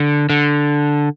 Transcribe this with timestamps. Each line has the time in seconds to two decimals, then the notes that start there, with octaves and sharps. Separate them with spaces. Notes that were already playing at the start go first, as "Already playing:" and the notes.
Already playing: D3
0.30 D3